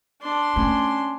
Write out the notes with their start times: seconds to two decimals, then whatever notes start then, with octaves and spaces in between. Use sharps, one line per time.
0.22 D4 C6
0.56 A3 C#4